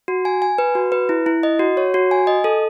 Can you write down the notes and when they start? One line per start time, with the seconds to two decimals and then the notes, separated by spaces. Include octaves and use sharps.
0.08 F#4
0.25 G#5
0.42 G#5
0.58 B4
0.75 F#4
0.92 B4
1.09 E4
1.26 E4
1.43 D#5
1.59 F#4
1.77 C#5
1.94 F#4
2.11 G#5
2.27 D#5
2.44 A4